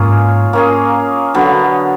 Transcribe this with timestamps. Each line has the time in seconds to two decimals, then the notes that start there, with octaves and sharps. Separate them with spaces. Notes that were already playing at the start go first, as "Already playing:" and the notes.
Already playing: G#2 A#3 C#4 F4 G#4
0.53 A#3 C#4 F4 G#4
1.34 D3 F#3 B3